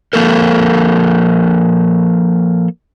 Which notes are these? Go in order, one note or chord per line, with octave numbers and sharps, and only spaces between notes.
F3 A#3 A4 A#4